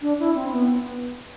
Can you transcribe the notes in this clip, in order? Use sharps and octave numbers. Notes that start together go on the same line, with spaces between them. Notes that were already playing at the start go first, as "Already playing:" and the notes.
D4
E4
C4
B3